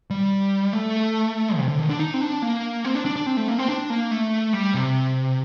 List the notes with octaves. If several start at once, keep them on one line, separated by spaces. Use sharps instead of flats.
G3
A3
C3
D3
D#3
D4
D#4
C4
D4
A#3
C4
D4
D4
D4
C4
A3
A#3
C4
D4
A#3
A3
G3
C3